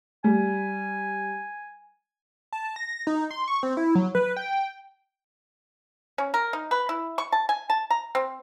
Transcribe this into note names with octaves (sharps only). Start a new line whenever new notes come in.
G3 G#5
A5
A#6
D#4
C6
C#6
C4
E4
F#3
B4
G5
C#4
A#4
D#4
B4
E4
C#6
A5
G#5
A5
A#5
C4